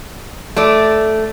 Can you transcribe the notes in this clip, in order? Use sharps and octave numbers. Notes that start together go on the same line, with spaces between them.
A3 D5